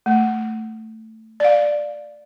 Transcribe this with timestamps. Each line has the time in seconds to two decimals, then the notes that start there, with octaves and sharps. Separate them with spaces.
0.06 A3
1.40 D5 F5